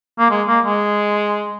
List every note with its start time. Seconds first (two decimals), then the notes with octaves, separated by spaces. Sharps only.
0.19 A#3
0.30 G#3
0.47 A#3
0.65 G#3